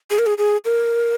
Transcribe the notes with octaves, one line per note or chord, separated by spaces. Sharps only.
G#4
A#4
G#4
G#4
A#4